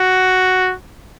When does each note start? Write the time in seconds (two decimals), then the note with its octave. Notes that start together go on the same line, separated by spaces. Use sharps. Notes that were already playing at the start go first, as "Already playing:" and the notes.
Already playing: F#4